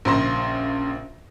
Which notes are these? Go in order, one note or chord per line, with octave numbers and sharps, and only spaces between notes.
A#1 C#3 C5 C6 A#6